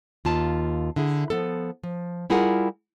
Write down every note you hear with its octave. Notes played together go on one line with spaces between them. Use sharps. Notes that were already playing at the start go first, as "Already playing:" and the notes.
D#2 F4 A5
D3 E4 G#4
F3 B3 A4
F3
G3 E4 F4 G#4 A#4 F#5